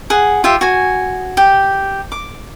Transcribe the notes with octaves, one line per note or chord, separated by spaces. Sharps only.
G#4 F#5
F4 G4 E5
F#4 G#5
G4
D6